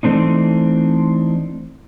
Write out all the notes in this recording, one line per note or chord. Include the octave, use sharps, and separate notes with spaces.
E3 A3 C4 D4 D#4